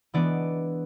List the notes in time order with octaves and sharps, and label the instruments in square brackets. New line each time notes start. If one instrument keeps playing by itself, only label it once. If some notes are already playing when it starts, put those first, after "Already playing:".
[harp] E3 G#3 B3 D4 D5